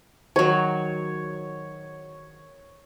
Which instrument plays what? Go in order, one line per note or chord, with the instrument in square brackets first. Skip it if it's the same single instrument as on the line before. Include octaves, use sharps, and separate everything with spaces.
[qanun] D#3 F#3 [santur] C#5